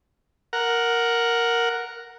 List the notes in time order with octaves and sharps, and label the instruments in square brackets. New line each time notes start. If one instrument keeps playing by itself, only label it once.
[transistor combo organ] A#4 F#5